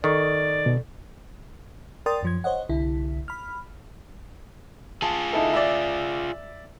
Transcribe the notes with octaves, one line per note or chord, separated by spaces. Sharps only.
D#3 A4 D5 C#6
B2
A#4 D5 G5 C6 D#6 A6
F#2 F3 G#6
C5 C#5 D#5 F#5
C2 D3 E4
B5 F6
F4 G#4 A5
D#4 E4 A4
D5 E5